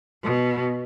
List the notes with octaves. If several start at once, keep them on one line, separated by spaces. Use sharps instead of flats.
B2